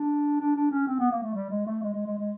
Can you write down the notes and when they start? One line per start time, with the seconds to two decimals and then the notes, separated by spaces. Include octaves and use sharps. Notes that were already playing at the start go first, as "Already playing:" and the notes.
Already playing: D4
0.40 D4
0.56 D4
0.71 C#4
0.87 C4
0.99 B3
1.11 A#3
1.23 A3
1.34 G3
1.50 G#3
1.66 A3
1.83 G#3
1.94 G#3
2.06 G#3
2.18 G#3